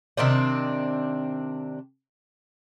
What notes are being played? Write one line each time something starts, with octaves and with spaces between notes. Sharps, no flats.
C3 D#3 C4 D4